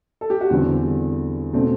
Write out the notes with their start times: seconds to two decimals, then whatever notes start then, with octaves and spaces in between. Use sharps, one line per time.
0.21 A4
0.30 G4
0.41 F#4
0.49 E2 D3 G3 C4 E4
1.53 B2 A3 C4